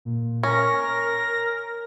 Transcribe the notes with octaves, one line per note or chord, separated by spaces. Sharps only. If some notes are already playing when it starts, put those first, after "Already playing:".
A#2
C#4 A#4 A#6